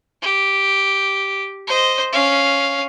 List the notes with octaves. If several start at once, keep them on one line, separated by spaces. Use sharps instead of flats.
G4
C5 D#5
C#4 F5